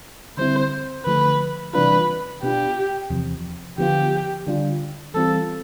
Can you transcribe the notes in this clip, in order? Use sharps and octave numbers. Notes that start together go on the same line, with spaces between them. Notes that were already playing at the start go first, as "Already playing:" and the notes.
D3 G3 C4 E4 C5
D3 F3 A3 B4
C3 E3 G3 D4 F4 B4
B2 B3 D4 F4 G4
E2 C3 F3
D3 F3 B3 F4 G4
D3 G3 D4 F4
E3 G3 C4 F4 A4